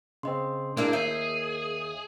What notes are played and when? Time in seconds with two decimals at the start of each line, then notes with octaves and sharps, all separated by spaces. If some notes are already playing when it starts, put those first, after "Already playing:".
0.23 C#3 C4 D#5 C6
0.77 A#3 D4 E4 G#4 A#4
0.93 D#2 G#4 E5 G6 C7